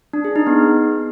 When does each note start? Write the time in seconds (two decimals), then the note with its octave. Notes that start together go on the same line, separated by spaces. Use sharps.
0.13 D4
0.25 G#4
0.36 D#4
0.47 B3